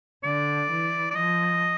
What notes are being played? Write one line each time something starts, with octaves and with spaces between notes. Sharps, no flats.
D3 D5
E3
D5
F3 D#5